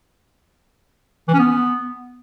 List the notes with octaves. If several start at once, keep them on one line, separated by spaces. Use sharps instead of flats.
E3
C#4
B3